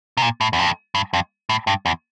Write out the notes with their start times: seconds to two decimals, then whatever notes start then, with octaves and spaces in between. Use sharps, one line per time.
0.17 C3
0.22 A#2
0.41 A2
0.53 E2
0.58 F2
0.95 G2
1.13 F2
1.49 A2
1.67 G2
1.86 E2